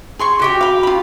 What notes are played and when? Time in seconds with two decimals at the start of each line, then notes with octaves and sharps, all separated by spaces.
0.19 G#4 C6 C#6
0.40 F#4 G4 G5
0.61 F5 B5
0.83 F4 B5